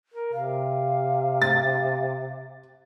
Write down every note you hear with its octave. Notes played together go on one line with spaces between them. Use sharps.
A#4
C3 F5
A6